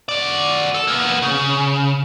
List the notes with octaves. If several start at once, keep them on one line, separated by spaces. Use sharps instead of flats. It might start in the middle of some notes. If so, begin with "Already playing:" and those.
F#4 D5
A4
A#3 B3
C#3